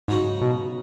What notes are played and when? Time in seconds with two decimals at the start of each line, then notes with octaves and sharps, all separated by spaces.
0.08 G#2 C#3 F#3 D#4 F#4
0.41 B2